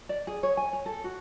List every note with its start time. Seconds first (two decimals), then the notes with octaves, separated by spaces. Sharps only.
0.09 D5
0.27 G#4
0.43 C#5
0.57 G#5
0.73 C#5
0.86 A4
1.04 F#4